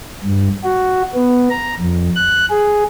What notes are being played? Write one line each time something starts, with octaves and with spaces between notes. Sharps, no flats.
G2
F#4
B3
A#5
F2
F#6
G#4